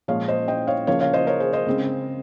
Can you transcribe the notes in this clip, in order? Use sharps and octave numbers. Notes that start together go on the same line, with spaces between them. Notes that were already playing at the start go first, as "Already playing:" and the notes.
A#2 F3 G#3 C#5 F5
C5 D#5
D#5 G5
C#5 F5
C#3 F3 A#3 C#5 F5
C#5 F5
C5 D#5
A#4 C#5
G#4 C5
C5 D#5
C#3 G#3 C4